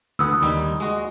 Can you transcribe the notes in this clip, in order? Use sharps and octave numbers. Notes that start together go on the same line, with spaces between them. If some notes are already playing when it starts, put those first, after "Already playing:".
D2 B4 F#5 D#6 E6
D#2 G3 D#4
G#3 F#4 D#5